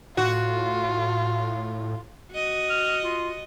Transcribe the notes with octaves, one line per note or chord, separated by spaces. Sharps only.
A2 F4 F#4
F#4 D#5
F6
F4